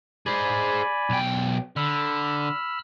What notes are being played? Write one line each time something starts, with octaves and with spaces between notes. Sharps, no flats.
G#4 C5 D5 G#5 B5
B1 G5
D3 B5 E6 F6